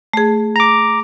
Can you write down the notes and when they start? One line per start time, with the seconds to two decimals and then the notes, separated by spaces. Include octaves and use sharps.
0.13 A3 G#4
0.56 A#5 D6